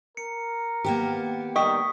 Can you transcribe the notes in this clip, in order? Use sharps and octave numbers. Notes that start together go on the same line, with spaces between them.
A#4 C#7
D#3 A#3 B3 G4
D#3 G3 D#5 G5 C#6 D#6 B6